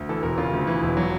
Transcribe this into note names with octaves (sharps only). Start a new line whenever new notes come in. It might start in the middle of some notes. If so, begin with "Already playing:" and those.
Already playing: D2
E3 A4
E1 A#4
C#3 F4
D2
E3
E1
F#3